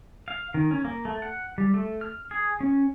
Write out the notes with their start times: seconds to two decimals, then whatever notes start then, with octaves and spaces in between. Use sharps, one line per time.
0.28 F5
0.54 D#3
0.71 C#4
0.85 A#3
1.05 A3
1.22 F#5
1.58 G3
1.74 A3
2.01 F6
2.31 G#4
2.61 C#4